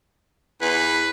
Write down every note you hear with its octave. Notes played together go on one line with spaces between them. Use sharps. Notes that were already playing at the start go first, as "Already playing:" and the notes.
E2 B4